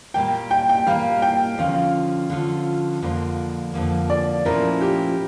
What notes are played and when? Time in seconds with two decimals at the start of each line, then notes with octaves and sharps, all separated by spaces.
0.14 A#2 G3 A#3 G5
0.51 G5
0.69 G5
0.87 A#2 G3 A#3 F5
1.22 G5
1.58 D3 F3 C#4 F4 F5
2.30 D3 F3 C#4 F4
3.02 F2 D3 F3 A#3
3.74 F2 D3 F3 A#3
4.10 D5
4.45 A#2 F3 A3 C#4 E4 A#4
4.81 G4